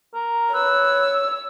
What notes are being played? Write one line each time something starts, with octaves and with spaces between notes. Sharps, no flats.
A#4
B4 C#5 E6